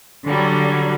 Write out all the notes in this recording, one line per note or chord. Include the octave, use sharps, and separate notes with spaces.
D3 F#3 G3